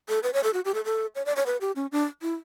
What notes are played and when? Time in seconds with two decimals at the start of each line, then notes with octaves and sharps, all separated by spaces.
0.09 A4
0.23 B4
0.33 C#5
0.43 A4
0.54 F#4
0.65 G4
0.74 A4
0.85 A4
1.15 C#5
1.26 D5
1.36 C#5
1.46 B4
1.61 G4
1.76 C#4
1.92 D4
2.22 E4